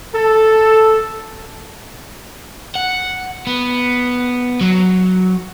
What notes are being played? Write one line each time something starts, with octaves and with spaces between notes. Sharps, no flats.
A4
F#5
B3
F#3